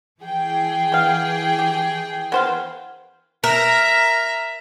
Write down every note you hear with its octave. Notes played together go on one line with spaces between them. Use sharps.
E3 G#4 G5
B3 F5
G4
B3 C5 F5
A#4 E5 A#5